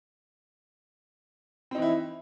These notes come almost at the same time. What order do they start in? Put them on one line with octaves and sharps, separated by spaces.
C4 D#4 E3 E4